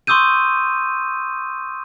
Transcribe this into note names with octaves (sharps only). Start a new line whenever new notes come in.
C6 C#6 D#6 E6 G6 D#7